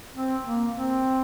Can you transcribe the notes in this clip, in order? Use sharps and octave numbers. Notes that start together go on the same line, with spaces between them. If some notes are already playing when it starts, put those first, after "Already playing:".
C4
A#3
C4